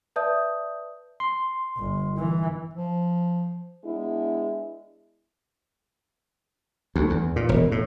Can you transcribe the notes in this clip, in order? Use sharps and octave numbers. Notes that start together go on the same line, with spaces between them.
B4 D5 E5 A5 D#6 G6
C6
G1
E3
F3
G#3 B3 D4 E4
D2
E2
A#2
E1
A2